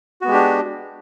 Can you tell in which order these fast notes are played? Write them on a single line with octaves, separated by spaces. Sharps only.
F#4 B3 G#3 G4 D4